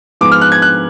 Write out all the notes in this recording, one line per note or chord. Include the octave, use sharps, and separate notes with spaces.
G#2 F3 G#3 B3 D6
F6
F#6
G#6
F#6